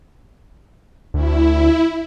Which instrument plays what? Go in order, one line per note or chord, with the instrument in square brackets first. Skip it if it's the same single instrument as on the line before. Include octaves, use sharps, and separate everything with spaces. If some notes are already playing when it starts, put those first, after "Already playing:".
[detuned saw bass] D2 [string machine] E4